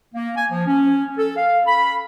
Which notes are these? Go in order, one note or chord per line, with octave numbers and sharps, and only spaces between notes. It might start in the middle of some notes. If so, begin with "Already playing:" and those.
A#3
G#5
F3
C#4
A4
F5
B5